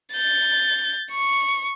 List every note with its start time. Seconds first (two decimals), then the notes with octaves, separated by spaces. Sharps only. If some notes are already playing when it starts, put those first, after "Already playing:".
0.13 G6 A6
1.11 C#6